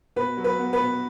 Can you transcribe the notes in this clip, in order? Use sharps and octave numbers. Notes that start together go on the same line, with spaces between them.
B2 B4
F#3
B4
B3
B4
B2